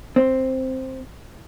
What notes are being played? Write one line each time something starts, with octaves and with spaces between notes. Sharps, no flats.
C4